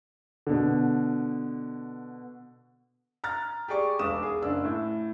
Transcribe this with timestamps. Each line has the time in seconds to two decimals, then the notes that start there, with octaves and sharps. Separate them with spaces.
0.47 B2 D3
3.24 A#5 F6 A6
3.68 G4 G#4 D5 C#6 D6
3.99 E1 B1 D6 D#6 E7
4.23 G#4
4.42 F#1 D4 E6
4.65 A2